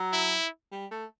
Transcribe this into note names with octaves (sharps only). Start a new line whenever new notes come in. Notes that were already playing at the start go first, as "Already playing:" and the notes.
Already playing: F#3
E4
G3
A3